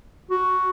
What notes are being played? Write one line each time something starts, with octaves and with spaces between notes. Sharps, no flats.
F#4